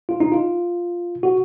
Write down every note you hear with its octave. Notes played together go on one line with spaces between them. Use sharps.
F4
D#4
F4
F#4